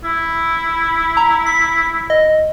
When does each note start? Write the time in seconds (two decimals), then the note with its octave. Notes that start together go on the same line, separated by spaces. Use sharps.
0.04 E4
1.17 A#5
1.46 B6
2.10 D#5